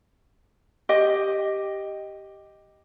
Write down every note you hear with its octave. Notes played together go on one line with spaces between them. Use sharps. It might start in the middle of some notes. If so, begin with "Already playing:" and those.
G4 D#5